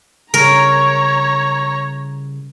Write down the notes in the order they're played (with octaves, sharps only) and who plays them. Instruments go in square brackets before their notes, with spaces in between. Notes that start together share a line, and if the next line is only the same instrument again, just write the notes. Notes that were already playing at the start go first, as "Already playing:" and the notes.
[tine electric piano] C#3 G3 [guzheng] A#4 [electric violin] C#5 A#5